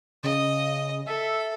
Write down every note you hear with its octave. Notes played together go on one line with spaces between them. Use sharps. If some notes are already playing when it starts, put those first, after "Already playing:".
C#3 D#5
A4 E5